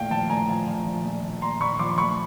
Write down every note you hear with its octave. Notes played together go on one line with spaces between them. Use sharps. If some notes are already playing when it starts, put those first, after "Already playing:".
Already playing: A#1 A2 F5 G5
F3 G5 A5
A2 G#5 A#5
F3
F3
F3
A#1
A#1
A#1 A#5 C6
A#1 B5 C#6
F3 C6 D6
C6
D2 B5 C#6